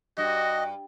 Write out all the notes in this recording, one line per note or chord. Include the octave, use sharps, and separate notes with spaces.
G2 F#4 D#5